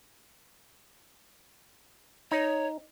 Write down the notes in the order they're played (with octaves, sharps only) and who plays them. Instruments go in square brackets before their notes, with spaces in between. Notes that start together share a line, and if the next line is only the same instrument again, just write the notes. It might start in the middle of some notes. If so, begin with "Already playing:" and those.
[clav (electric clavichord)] D#4 [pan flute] C#5